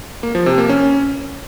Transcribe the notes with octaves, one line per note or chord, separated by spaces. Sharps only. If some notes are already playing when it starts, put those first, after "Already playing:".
A#3
F3
C3
A#3
C#4